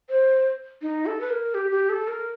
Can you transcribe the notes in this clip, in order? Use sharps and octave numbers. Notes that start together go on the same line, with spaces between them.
C5
D#4
A4
B4
A#4
G4
G4
A4
A#4